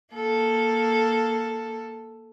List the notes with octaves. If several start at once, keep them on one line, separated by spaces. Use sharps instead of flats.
A#3 A4